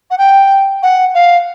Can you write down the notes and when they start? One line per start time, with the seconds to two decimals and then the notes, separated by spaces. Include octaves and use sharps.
0.11 F#5
0.18 G5
0.83 F#5
1.14 F5